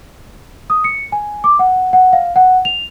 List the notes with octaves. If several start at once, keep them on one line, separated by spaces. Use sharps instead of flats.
D#6
C#7
G#5
D6
F#5
F#5
F5
F#5
F7